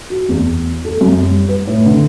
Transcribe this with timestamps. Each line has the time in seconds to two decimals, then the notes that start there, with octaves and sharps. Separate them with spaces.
0.10 F#4
0.29 E2
0.85 A4
1.01 F#2
1.23 G3
1.49 B4
1.67 A2
1.86 D3